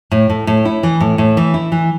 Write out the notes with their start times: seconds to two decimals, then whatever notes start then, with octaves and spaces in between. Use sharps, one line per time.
0.11 A2
0.30 A2
0.47 A2
0.65 E4
0.83 E3
1.00 A2
1.18 A2
1.37 E3
1.54 E4
1.72 E3